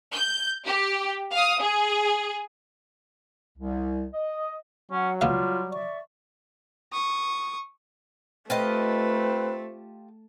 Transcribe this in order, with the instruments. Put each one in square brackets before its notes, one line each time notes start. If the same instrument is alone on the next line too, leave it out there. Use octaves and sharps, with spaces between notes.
[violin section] G6
G4
F5 D#6
G#4
[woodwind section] C2
D#5
[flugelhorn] F#3 [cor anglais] C#4 [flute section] F#5
[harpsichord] C#2 B3 F5 [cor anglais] G3 [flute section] F4
[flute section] D5 E5 C#6
[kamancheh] C#6 D#6
[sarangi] A3 [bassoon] C4 [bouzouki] F4 G4 D#5 [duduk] B4